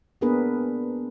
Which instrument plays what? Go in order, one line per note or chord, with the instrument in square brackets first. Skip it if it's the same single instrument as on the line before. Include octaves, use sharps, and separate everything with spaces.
[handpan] A#3 B3 D4 G#4 A#4 B4